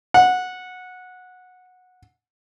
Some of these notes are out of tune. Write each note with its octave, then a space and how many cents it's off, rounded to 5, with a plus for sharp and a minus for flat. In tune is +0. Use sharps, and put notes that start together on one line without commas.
F#5 -15